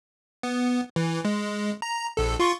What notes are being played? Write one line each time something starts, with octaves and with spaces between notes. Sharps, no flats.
B3
E3
G#3
A#5
A#1 A4
F4 C6 C#6